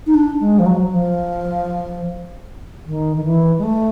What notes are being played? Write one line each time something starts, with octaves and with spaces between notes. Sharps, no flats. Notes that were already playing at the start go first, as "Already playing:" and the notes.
D#4
D4
G#3
F3
F#3
F3
D#3
D#3
E3
G#3
A3